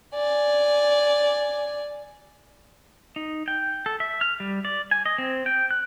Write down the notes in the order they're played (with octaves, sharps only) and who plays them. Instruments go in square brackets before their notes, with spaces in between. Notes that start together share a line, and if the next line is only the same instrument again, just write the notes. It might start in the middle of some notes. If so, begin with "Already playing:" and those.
[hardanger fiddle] D5 G#5
[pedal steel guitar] D#4
G5
A4
E5
F6
G3
D5
G#5
D#5
C4
G5
F#6